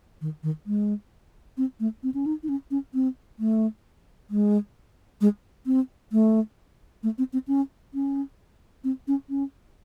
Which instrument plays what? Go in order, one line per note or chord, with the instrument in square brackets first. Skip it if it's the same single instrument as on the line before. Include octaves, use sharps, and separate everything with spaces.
[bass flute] D#3
D#3
G#3
C4
A3
C4
C#4
D#4
D#4
C#4
C#4
C4
A3
G#3
G#3
C4
A3
A3
C4
C4
C#4
C#4
C4
C#4
C#4